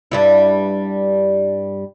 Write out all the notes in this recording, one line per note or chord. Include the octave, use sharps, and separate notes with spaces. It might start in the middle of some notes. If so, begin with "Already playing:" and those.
G2 G3 E4